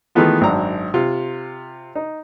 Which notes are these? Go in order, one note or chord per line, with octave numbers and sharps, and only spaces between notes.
D#3 E3 G#3 A3 B3 F4
G#1 F#2 D4 A#5
C3 F4
D#4